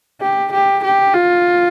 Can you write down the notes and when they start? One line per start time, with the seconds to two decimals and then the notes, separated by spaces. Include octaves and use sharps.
0.21 G4
0.52 G4
0.84 G4
1.14 F4